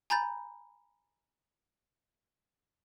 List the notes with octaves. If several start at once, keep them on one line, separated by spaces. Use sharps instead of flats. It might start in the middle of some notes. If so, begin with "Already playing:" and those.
G#5 A#5 B5 G6 A6